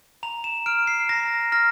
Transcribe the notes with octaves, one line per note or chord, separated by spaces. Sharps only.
A#5 F7
E7
F6 D7
C7
A#5 A#6
F6 A#6